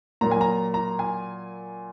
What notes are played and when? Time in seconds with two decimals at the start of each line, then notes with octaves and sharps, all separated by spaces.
0.21 A#2 F#3 A#3 A#5
0.31 G#5
0.41 A#5
0.74 A#5
0.99 G#5